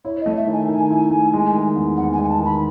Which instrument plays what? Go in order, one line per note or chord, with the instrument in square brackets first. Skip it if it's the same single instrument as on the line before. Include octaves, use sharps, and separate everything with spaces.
[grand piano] E4 [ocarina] C#5
[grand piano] A3 [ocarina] D#5
[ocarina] E5
[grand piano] D#3
[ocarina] G#5
[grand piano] D#3 [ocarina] G#5
[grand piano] E4
A3
G#3
D#3
E2
[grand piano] E2 [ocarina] F#5
[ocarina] G#5
[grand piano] G#3
[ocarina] G#5
A5
[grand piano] D#3 [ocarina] B5